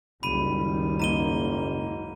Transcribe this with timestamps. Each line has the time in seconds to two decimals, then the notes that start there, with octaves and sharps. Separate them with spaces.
0.23 F#1 C#2 D#3 G3 B5 D#7
1.00 G#2 A#3 A#5 D#7 G7